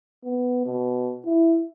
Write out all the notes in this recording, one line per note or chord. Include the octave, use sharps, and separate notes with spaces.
B3
B2
E4